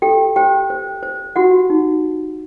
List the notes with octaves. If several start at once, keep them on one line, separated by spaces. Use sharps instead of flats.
G4 A4 G5
G4 C5 G5
C5
C5
F#4 G4 F#5
D#4